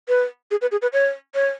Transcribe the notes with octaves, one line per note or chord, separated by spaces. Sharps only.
B4
G#4
B4
G#4
B4
C#5
C#5